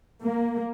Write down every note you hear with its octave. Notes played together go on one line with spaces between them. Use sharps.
A#3